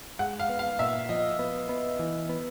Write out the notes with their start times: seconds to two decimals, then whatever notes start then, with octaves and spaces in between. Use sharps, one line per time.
0.19 G#3 F#5
0.39 F5
0.49 B3
0.59 F5
0.79 A#2 E5
1.09 F3 D#5
1.39 B3
1.69 B3
1.99 E3
2.29 B3